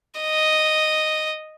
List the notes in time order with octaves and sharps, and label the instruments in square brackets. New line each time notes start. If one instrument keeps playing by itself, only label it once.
[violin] D#5